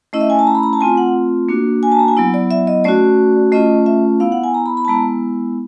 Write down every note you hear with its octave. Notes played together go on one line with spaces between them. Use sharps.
A3 C#4 E4 D#5
E5
G#5
A5
A#5
B5
A#5
A5
A3 C4 F4 G#5
F#5
A#3 D4 F#4
G#5
A5
A#5
G#5
F#3 B3 E4
D5
E5
D#5
A3 C#4 F#4 D5
A3 C#4 F4 D#5
E5
B3 E4 F5
F#5
G#5
A#5
B5
B5
A5
G#3 B3 E4 A#5